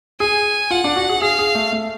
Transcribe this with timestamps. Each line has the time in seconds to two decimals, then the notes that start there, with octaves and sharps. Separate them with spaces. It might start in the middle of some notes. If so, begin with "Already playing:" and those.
0.20 G#4 G#5
0.71 F4 F#5
0.84 D4
0.96 F#4
1.09 G#4
1.22 G#4 F5
1.39 G#4
1.55 A3
1.72 A3